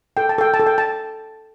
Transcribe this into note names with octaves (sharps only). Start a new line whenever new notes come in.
A4 G5
A5
A4 G5
A5
A4
G5
A5